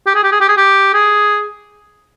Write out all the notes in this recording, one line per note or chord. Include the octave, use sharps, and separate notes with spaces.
G4
G#4
G4
G#4
G4
G#4
G4
G#4